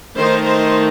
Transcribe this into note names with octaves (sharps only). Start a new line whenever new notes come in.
D#3 A3 D#4 C5
C5